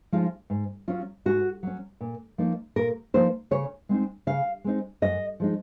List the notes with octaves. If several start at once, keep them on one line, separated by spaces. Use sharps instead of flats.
F3 G#3 D#4 F4
G#2
F#3 C#4 F4
G#2 F#4
F#3 C#4
A#2
F3 A#3 D#4
A#2 A#4
F3 A#3 D#4 C5
C#3 C#5
G#3 C4 D#4
C#3 F5
G#3 C4 D#4
F#2 D#5
F3 G#3 D#4